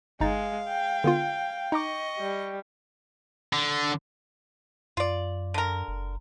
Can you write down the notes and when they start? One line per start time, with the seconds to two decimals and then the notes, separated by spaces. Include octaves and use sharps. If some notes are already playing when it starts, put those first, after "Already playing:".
0.21 G1 G#3 D#4 F5 A6
0.68 G5
1.04 D3 B3 F4
1.72 D#4 D#5 A#5 C#6 D6
2.19 G3
3.53 D3
4.97 F#2 F4 D5
5.54 D3 A#4
5.88 F#1